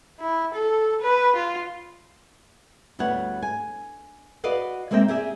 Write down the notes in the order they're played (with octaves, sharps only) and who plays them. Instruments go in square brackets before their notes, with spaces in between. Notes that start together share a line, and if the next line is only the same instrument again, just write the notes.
[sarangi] E4
A4
B4
F4
[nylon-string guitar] D2 G3 B3 C#5 F#5
G#5
F#4 B4 D5 D#5 F5 F#5
G#3 A#3 C4 E5 G5
G4 G#4 D5 E5